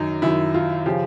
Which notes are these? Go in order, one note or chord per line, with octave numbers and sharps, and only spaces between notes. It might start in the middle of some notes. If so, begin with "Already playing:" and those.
Already playing: F#2 D#3 D#4
F#2 D#3 E4
F4
C#3 F3 G4